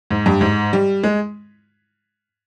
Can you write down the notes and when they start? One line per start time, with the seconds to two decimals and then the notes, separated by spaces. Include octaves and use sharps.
0.11 G#2
0.26 G2
0.41 G#2
0.73 G3
1.03 G#3